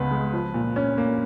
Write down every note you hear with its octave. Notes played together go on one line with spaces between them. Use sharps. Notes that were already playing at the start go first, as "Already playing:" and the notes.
Already playing: C#2 C#3 B3 B4
G#3
F3
A#2
C#4
A#3